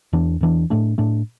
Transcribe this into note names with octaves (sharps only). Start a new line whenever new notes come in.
E2 E3 D4
E2 E3 D4
A2 A3 D4
A2 A3 D4